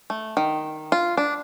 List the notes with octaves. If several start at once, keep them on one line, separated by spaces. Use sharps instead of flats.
A3
D#3
F4
D4